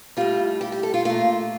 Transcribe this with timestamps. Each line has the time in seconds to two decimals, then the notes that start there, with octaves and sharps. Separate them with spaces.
0.17 A2 G3 F4
0.61 G4
0.72 G4
0.83 A4
0.94 F4
1.05 A#2 A3 F4